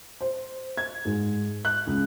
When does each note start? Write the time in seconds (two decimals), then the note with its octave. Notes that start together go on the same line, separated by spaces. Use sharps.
0.21 C5
0.77 G#6
1.05 G#2
1.65 F#6
1.87 C#2